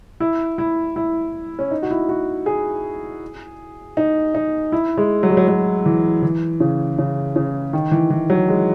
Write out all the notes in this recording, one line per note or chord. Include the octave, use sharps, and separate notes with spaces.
E4
E4
E4
C#4
D#4
F#4
E4
F#4
G#4
D#4
D#4
E4
G#3
F#3
G#3
F#3
F#3
E3
E3
C#3
C#3
C#3
D#3
E3
E3
F#3
G#3